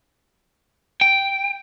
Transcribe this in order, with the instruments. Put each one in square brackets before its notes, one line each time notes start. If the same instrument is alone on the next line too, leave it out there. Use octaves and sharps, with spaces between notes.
[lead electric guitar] G5